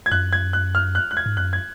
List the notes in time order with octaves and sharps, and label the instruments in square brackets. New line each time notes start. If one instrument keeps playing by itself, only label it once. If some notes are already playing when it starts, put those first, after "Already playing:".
[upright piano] G#6
[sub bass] F#2 [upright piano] F#6
[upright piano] G#6
F#6
F6
F#6
F#6
G#6
[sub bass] G#2
[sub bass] F#2 [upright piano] F#6
[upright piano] G#6